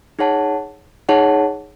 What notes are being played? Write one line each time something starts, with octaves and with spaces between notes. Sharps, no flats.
D#4 G#4 C#5 F#5 A5
D#4 G#4 C#5 F#5 A5